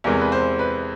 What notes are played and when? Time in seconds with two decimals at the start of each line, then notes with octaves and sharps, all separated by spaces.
0.04 E2 C3 E3 G#3 A#4
0.21 B4
0.32 C5
0.59 B4